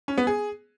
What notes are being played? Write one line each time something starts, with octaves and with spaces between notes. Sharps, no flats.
C#4
B3
G#4